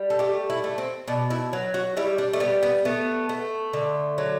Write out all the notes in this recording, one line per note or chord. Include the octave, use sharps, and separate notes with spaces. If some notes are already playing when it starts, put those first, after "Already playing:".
Already playing: G3
A4
A3 G4
E4
A3
C4
B2 D4
E4
F#3
F#4
G3 E4
D4
A3
G3 B3
B3
A3 B3
A3
D3
F#3